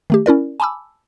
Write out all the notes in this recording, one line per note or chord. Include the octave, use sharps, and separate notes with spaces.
D#3 A3 G4
C#4 E4 A#4 D5
G#5 A5 B5 D6 E6